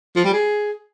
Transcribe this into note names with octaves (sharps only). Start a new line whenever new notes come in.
F3
G3
G#4